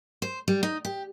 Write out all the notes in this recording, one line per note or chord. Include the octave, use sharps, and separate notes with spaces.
C5
G3
D#4
G4